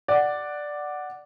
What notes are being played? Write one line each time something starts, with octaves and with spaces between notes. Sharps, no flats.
D5 F#5